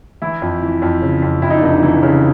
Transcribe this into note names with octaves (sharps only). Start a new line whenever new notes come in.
E3 E4
F2
E3
F2
C#3
F2
F2 E4
D#4
D4
F1 D#4
E3
C#3